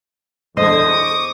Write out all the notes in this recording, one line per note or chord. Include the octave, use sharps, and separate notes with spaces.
E2 D3 C5 D#5 D#6 G#6
C#6 D6